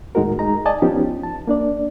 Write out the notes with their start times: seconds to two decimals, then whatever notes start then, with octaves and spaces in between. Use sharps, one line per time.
0.15 D#2 A2 G#3 D#4 F#4 A#4
0.39 G#3 D#4 A#5
0.66 D5 D#5 G#5 A5
0.82 F3 B3 C#4 D#4 G4
1.23 A5
1.47 A#3 D4 D5